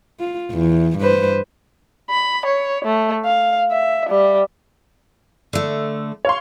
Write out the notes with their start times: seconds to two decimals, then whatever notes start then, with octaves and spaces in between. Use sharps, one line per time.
0.20 F4
0.51 E2
0.98 G2 B4 C5
2.10 B5
2.46 C#5
2.85 A3
3.25 F5
3.71 E5
4.09 G3
5.53 D3 A3
6.25 C#5 F5 C6